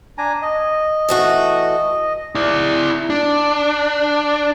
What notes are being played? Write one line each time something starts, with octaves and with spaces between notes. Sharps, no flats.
D4 G#5 A#5
D#5
E3 A3 F#4
E4 D5
D4